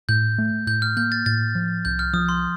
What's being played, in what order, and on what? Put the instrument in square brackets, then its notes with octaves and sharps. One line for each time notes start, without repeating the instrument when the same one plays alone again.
[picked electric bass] A2 [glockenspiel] G6
[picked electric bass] A3
[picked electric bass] A2 [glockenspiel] G6
[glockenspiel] F6
[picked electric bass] A#3 [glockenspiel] G6
[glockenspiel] A6
[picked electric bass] A2 [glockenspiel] A6
[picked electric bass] F3
[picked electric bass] C2 [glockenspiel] G6
[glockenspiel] F6
[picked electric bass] F3 [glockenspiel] D#6
[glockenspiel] C6